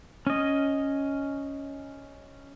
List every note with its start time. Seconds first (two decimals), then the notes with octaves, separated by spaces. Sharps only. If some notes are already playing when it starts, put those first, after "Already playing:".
0.27 C#4 D#5